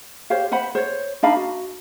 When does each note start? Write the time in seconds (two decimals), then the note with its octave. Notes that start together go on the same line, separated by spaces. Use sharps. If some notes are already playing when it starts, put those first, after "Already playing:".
0.30 G4 C5 C#5 F5
0.52 B4 C5 F#5 B5
0.75 C5 C#5
1.23 D4 D#4 F5 B5
1.36 F#4